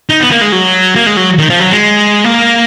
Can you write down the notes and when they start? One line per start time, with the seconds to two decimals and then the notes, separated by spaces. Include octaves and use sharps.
0.09 D#4
0.20 B3
0.31 A#3
0.41 G#3
0.52 F#3
0.95 A#3
1.06 G#3
1.17 F#3
1.38 D#3
1.49 F3
1.60 F#3
1.71 G#3
2.24 A#3